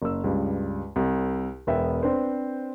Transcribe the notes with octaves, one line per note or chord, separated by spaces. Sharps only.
F#1 E6
C#2 G2
C2
E1 B3 E5 G5
C4 D4 B4 C5